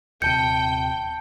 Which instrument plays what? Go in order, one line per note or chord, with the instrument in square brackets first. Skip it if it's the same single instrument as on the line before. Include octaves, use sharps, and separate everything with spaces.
[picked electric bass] D#1 C3 [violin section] G5 [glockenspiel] A5 C#7 [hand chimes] G6